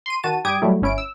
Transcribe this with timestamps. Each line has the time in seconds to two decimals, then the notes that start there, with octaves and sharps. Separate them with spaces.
0.06 C6 D#7
0.23 D#3 F#4 A5 D#7
0.45 G2 G3 G4 D#6 G#6 D7
0.62 F#3 G3 A3 E4
0.82 G1 C#4 E4 D7
0.98 E6